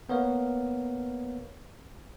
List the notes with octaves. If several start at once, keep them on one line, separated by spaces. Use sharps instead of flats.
A#3 B3 A#4 C#5 F5